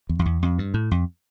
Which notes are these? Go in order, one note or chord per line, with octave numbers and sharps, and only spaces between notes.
E2
F2
E2
F2
G2
A2
F2